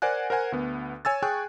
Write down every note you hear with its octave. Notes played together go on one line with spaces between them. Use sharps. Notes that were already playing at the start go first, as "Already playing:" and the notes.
A#4 C5 D5 F#5 G#5 F#6
A#4 C5 F#5 G#5
D2 B3
C#5 G#5 E6 A6
G#4 G5 G#5 C#6 F#6